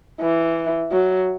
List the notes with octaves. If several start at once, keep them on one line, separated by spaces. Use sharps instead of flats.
E3
F#3